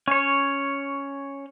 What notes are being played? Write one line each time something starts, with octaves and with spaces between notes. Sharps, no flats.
C#4 C#5